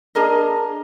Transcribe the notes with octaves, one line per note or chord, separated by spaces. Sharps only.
D4 G#4 A#4 D#5